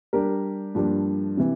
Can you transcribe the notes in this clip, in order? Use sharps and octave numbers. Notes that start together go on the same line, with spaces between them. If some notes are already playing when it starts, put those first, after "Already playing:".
G3 D4 G4 A#4
G2 F3 A#3 D4 G4
C3 E3